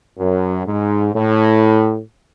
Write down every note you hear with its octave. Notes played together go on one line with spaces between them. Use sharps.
F#2
G#2
A2